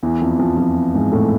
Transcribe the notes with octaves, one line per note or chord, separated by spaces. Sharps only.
E2 E3
F2 F3
F2 F3
F2 F3
G#2 G#3
A2 A3